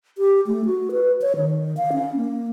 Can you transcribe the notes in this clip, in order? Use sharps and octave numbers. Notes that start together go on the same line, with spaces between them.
G4
A3
F#4
B4
C#5
D#3
F5
C#4
A#3